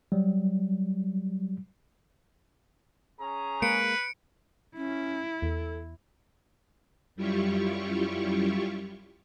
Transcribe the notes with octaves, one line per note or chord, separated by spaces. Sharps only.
F#3 G3
C#4 G#4 A#5
G#3 A#3 B4 C#7 D7
C#4 E4
E2 A4
F#2 G3 E4 F4 G4 C#6